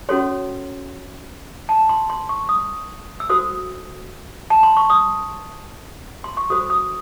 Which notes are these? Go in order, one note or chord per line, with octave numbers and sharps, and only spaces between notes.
C#4 F#4 A4 C#5 C6
A5
C6
C6
C#6
D#6
E6
F#4 A4 C5 D#6
A5
C6
C#6
D#6
C6
C#6
F#4 A4 C5 D#6
D#6